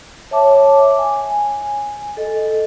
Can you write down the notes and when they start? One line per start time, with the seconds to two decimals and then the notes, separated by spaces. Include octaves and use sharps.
0.31 C#5 E5 A5 D6
0.98 G#5
2.17 A4 D#5